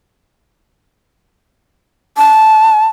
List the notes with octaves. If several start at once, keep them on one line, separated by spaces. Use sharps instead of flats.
A5